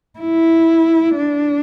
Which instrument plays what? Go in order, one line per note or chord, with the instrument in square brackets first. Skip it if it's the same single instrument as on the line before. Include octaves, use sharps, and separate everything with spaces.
[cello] E4
D4